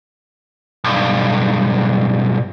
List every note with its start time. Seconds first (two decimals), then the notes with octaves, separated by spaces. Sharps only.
0.84 B1 G2